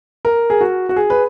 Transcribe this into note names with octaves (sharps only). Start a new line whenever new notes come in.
A#4
G#4
F#4
F#4
G#4
B4